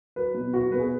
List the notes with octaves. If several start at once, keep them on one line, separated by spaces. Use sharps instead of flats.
F#3 B4
B2
F#3 F#4
B2 B4
G#4